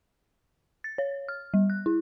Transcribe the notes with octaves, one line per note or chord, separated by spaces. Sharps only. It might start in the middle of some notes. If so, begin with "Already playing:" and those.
A6
C#5
F6
G3
F#6
E4